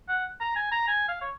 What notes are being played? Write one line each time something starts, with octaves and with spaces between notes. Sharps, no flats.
F#5
A#5
G#5
A#5
G#5
F5
C#5